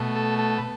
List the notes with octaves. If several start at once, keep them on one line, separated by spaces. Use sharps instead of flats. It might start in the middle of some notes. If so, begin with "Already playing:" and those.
Already playing: B2 A3
A4
A4
B4